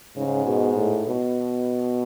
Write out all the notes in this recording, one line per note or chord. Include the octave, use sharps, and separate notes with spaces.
G#2 C#3
B2
A2
B2